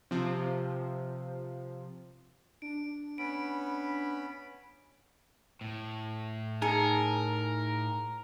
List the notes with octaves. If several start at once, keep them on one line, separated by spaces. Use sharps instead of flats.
C3 F3
D4 D7
B3 C#4 B5 D7
A2
D#4 G#4 A#4 A5 C#7